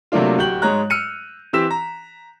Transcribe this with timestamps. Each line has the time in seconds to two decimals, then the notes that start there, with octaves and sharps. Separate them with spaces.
0.12 C3 F#3 A3 A#3 D4 F4
0.38 D1 F#4 G4 G5 G6 F#7
0.62 G#2 G#3 C#5 A#5 F#6
0.90 E6 F6 C#7 D#7
1.53 E3 C4 G4 E6 B6 E7
1.71 A#5